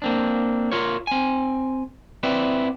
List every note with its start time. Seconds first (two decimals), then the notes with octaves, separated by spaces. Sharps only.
0.02 A#3 C4 D4
0.72 F4 A#4 C#5
1.07 C4 G#5
2.23 C4 E4 B4 D5